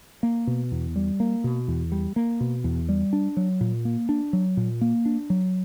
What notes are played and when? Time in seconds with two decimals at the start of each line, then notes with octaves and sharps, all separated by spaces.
0.23 A#3
0.47 B2
0.72 E2
0.96 G3
1.20 A#3
1.44 B2
1.68 E2
1.92 G3
2.16 A#3
2.40 B2
2.64 E2
2.89 G3
3.13 D4
3.37 F#3
3.61 A#2
3.85 A#3
4.09 D4
4.33 F#3
4.57 A#2
4.81 A#3
5.06 D4
5.30 F#3